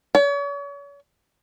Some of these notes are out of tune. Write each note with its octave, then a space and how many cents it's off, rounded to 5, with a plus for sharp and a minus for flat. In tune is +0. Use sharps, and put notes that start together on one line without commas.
C#5 +40